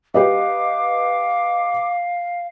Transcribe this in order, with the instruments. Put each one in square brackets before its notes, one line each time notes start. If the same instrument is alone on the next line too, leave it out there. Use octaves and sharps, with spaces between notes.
[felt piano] G4 B4 D#5 [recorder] F5 [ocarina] D6